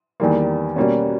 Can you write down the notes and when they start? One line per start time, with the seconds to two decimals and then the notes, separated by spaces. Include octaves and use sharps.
0.20 E2 D#3 G3 A#3
0.76 B2 G3 A#3 C#4